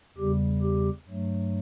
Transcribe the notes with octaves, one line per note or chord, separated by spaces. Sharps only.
E2 C#3 G3 G4
G4
G2 F#3 A3